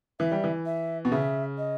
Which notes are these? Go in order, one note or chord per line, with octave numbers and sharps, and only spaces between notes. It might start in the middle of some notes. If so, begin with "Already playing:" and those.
E3 E5
G3
E3
E5
B2
C#3 E5
D#5